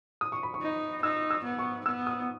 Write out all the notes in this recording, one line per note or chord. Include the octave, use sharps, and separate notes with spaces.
D#6
C#6
B5
C#6
D#4
D#4 E6
E6
B3
C#6
B3 E6
D#6